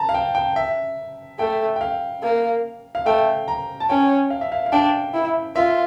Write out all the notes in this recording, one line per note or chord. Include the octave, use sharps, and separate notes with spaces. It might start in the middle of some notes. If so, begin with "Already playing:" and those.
Already playing: A5 A#5
F5
G5
G5
E5
A3 G5
G5
F5
A#3
F5
A3 G5
A#5
A5
C#4 G5
F5
E5
F5
F5
D4 G5
E4
F4 E5